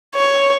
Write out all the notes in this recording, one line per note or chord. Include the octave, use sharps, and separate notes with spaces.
C#5